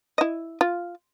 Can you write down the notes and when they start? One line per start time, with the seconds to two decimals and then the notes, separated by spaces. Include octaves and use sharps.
0.18 E4 D#5
0.61 F4